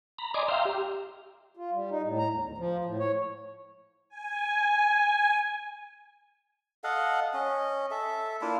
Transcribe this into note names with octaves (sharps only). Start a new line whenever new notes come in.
A#5 B5
D5 D#5 G#5 A#5 C6 D6
E5 F5 G5 A#5 C6
G4
F4
G3
D#4
A2
A#5
E2
D2
F3
A2
C#5
G#5
A4 D#5 F5 F#5
C#4 D#5
A4 E5
A#3 D4 E4 F4